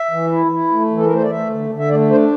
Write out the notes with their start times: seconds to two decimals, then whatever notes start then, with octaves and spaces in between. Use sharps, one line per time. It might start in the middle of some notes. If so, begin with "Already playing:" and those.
Already playing: E5
0.11 E3
0.32 E4
0.52 E4
0.71 A3
0.90 E3
0.97 A4
1.06 A#4
1.10 A3 C5
1.23 D5
1.30 A3 E5
1.50 D3
1.70 D3
1.79 E5
1.89 A3 D5
2.10 D4 C5